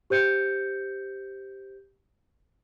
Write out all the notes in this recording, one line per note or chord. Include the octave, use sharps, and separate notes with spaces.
G4 C5 G6 C#7